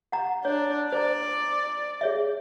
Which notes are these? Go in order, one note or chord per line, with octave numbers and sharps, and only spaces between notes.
F#5 A#5
D4 C#5
C5 D5 A#5
G#4 C#5 E5